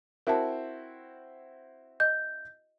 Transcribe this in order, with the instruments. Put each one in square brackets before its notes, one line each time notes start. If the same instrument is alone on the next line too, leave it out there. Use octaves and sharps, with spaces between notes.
[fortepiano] C4 E4 F#4 [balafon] A#4 A5
[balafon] D#5 [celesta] G6